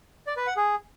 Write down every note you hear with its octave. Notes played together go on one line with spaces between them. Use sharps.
D5
B4
F#5
G#4